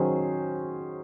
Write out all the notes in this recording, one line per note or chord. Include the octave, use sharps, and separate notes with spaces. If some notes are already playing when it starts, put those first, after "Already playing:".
Already playing: D#3 F#3 C#4 G#4 C5